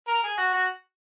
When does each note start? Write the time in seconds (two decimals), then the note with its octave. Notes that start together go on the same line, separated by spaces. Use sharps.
0.08 A#4
0.23 G#4
0.38 F#4
0.53 F#4